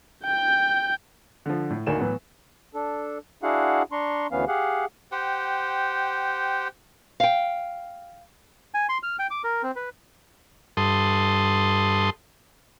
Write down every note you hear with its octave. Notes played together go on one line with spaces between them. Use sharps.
G5 G6
D3 F3
A2
D2 D#3 A#3 G#5 E7
A2 E3 F#3 B3 F#4
D4 A4
D4 E4 F#4 G#4 F5 F#5
D4 A#5 C6 C#6
D2 E3 B3 C#4 F5
G4 G#4 F5 F#5
G4 C5 F#5 G5
F5 G5
G#5
C6
F6
G5
D6
A#4
C4
B4
G2 A4 C6 D#6